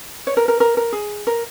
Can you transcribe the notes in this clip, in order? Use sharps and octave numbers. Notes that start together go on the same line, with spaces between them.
C#5
A#4
A#4
A#4
A#4
G#4
A#4